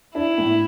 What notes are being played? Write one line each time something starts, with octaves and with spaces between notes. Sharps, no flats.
D4 E4
A2